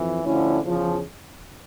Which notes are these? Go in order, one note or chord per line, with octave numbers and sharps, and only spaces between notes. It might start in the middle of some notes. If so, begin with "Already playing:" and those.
Already playing: F2 E3
D2 D3 F3 C#4 E4
E2 C#3 F3